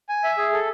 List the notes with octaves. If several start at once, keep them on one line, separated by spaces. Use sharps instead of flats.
G#5
E5
G#4
A4